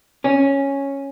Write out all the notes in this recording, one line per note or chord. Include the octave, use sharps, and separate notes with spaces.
C#4